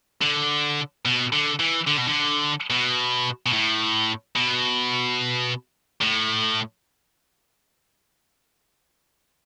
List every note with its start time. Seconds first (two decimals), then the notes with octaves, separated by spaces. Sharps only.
0.22 D3
1.05 B2
1.33 D3
1.60 E3
1.87 D3
1.98 B2
2.09 D3
2.70 B2
3.46 B2
3.53 A2
4.36 B2
6.01 A2